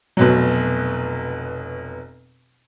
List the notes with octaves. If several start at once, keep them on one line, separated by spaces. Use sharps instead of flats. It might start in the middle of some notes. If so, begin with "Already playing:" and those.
F1 B2 F#3